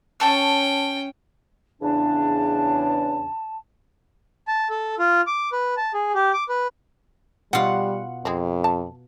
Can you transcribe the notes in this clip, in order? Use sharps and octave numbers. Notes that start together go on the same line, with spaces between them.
C#4 C#5 G5 A5 E6
E2 C#3 D4 A5
A5
A4
F4
D6
B4
A5
G#4
G4
D6
B4
B2 G3 F4 F#5
F2 G#3 C4
A5